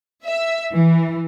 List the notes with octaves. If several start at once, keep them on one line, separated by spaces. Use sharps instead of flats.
E5
E3